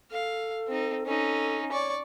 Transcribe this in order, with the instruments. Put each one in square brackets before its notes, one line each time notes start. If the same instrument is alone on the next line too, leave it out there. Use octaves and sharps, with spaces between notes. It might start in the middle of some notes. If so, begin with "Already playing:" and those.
[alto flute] A4 [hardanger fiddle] F5
[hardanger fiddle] C4 D#4
[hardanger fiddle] C#4 D#4 [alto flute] A4
[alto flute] C#5 [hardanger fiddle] D5 C#6